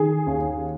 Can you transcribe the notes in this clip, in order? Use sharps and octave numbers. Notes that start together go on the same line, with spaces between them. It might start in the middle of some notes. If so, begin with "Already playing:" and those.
Already playing: D#3 G#4
D#2